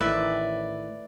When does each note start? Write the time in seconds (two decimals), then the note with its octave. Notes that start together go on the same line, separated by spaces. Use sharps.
0.01 A1 A2 D#3 B4 D5 E5